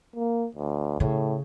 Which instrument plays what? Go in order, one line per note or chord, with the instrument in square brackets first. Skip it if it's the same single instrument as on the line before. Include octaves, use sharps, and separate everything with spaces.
[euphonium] A#3
D2
[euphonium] A2 [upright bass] C#3